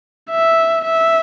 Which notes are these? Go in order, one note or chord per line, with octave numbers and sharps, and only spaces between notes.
E5
E5